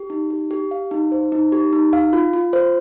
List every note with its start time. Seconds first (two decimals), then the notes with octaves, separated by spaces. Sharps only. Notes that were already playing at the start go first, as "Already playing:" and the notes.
Already playing: G4
0.10 D#4
0.30 G4
0.51 G4
0.71 F5
0.91 D#4
1.12 C5
1.32 D#4
1.52 G4
1.73 D#4
1.93 F5
2.13 F4
2.33 F4
2.53 C5